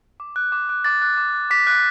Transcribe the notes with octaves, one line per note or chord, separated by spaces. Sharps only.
D6
F#6
D6
F#6
D6 A6
F#6
D6
F#6
D6 B6
F#6